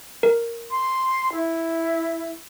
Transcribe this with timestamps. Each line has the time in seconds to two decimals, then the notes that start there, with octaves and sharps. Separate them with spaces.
0.23 A#4
0.71 C6
1.33 E4